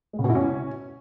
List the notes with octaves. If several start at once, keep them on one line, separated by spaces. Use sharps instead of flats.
G#3
C#3
B2
E4
C#4